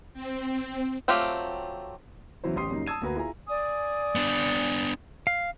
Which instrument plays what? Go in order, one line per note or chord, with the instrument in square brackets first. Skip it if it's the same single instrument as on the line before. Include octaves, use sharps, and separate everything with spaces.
[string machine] C4
[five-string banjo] F#3 A3 C4 F4 G4
[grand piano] E2 C#3 E3 F#3 E4 C5
A1 C#3 G4 C6 D#6 C7
F#2 C#3 G3 A#3 D#4
A5 D#6 E6 G#6 D#7
D2 A#3 F#4 B4 A#5
E4 F4 G#4 G#5 A#5
[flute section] D5 G#5 D#6
[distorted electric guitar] B3 D4
[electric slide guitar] F5